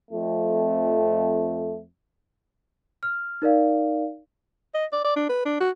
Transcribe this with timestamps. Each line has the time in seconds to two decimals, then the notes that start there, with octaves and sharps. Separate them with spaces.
0.11 F2 A3
3.03 F6
3.42 D#4 A#4 D5 F5
4.75 D#5
4.93 D5
5.05 D5
5.16 D4
5.29 B4
5.46 D4
5.61 F#4